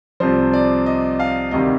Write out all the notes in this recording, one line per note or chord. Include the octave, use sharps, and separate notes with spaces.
C2 C3 F3 C5
D5
D#5
F5
D2 C3 D#3 G3 D#5